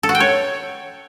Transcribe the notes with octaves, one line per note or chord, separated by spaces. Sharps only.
A4
F#4
G5
C#5